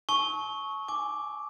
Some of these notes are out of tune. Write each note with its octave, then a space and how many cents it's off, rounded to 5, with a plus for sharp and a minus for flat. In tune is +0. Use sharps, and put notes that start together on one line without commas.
A5 -40 C#6 +0 E6 -45
G#5 +0 D6 +0